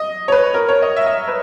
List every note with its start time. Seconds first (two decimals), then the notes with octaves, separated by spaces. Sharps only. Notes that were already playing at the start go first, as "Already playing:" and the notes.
Already playing: D#5
0.28 C#5
0.32 B4
0.54 A#4
0.68 C#5
0.82 D#5
0.96 E5
1.06 D#5
1.28 B4